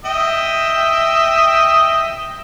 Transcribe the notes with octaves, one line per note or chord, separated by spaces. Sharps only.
D#5 E5 G5